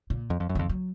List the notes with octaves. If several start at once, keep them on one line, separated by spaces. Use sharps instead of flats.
A#2
F2
F2
F#2
F2 D#3
F#3